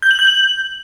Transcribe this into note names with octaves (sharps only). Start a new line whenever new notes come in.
G6
F#7
G6
F#7